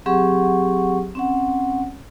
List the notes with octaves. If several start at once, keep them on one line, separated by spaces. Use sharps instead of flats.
F#3 C4 G4 G#4 F#5 C#6
C4 C#4 F#5